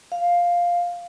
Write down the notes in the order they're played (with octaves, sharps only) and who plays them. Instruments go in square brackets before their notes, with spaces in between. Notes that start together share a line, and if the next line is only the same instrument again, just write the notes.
[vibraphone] F5